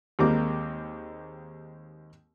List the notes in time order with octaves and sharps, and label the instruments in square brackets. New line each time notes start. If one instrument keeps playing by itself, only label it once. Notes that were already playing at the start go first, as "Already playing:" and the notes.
[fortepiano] D#2 G3 G#3 A#3 C4 D6